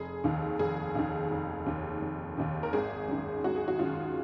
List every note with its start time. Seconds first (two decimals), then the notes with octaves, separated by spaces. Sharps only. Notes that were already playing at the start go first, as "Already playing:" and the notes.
Already playing: F1 G#4
0.24 D#2 D#3
0.59 F1 G#4
0.95 D#2 D#3
1.31 F1
1.66 D#2 D#3
2.02 F1
2.37 D#2 D#3
2.63 A#4
2.73 G#1 G#4
3.08 F#2 D#3
3.44 G#1 F#4
3.56 G#4
3.68 F#4
3.79 F#2 D#3 F4